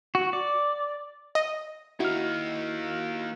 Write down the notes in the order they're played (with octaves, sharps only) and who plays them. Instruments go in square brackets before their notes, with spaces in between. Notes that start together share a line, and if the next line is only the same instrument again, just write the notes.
[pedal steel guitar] F#4
D5
[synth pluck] D#5
[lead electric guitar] A#3 D#4 [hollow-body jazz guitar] E4 [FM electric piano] F#4 F6